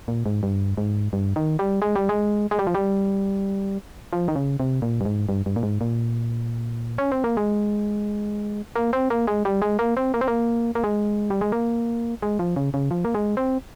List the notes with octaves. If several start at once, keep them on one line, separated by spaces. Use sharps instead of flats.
A#2
G#2
G2
G#2
G2
D#3
G3
G#3
G3
G#3
G#3
G3
F3
G3
F3
D#3
C#3
C3
A#2
G2
G#2
G2
G2
A#2
G#2
A#2
C#4
C4
A#3
G#3
A#3
C4
A#3
G#3
G3
G#3
A#3
C4
A#3
C4
A#3
A#3
G#3
G3
G#3
A#3
G#3
F3
C#3
C#3
F3
A#3
G#3
C4